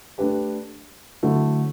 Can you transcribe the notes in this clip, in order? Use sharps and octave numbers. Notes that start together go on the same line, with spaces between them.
A3 D4 G4 B4
D3 F#3 A3 E4